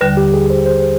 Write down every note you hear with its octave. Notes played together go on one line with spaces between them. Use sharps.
D#2 D3 G3 B4
G4
G#4
C5
C5